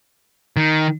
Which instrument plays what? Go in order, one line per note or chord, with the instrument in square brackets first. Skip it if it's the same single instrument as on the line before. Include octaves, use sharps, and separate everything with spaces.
[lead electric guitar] D#3